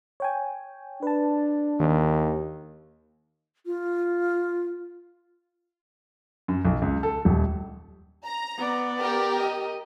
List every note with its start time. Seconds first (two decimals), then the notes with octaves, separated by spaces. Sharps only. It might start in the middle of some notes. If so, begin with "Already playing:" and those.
0.20 C#5 G5 G#5
1.03 D4 B4 A5
1.80 D#2 D#3
3.66 F4
6.48 F#2
6.65 B1
6.82 C#2
7.03 A4
7.25 D#1
8.25 A#5
8.58 B3 D5
8.99 G4 A#4
9.40 D#5